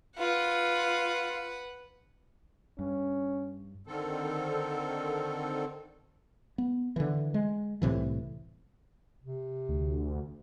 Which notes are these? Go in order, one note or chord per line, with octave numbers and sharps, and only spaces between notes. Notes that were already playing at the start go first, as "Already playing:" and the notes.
F4 B4 F#5
G2 C#4
D3 D#3 C4 A4
B3
D3 E3
G#3
C2 A2 C3 E3
C3
D2